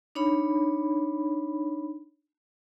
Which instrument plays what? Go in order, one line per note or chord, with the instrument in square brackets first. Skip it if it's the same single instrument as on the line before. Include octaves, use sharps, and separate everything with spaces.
[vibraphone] D4 D#4 C#5 B5